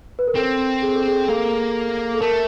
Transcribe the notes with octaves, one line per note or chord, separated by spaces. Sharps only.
B4
A#4
C4 A4
G#4
A4
G#4
A#3 A4
A4
A3 A#4